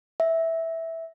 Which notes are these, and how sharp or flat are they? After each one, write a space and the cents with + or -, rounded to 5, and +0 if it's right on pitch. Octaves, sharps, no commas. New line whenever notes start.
E5 -10